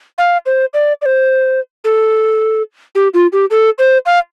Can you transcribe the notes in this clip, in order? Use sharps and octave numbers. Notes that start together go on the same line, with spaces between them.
F5
C5
D5
D5
C5
A4
G4
F4
G4
A4
C5
F5